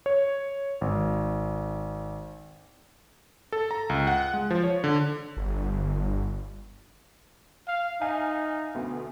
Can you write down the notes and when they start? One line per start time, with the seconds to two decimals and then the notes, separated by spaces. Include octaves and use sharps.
0.06 C#5
0.81 G#1
3.52 A4
3.71 A#5
3.90 C#2
4.07 F#5
4.34 G#3
4.50 F3
4.63 C#5
4.84 D3
5.37 G1
7.68 F5
8.01 D#4 E5 F5 G#5
8.75 D2 B2